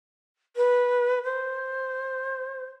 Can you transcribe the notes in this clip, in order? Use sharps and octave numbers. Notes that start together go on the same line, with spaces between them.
B4
C5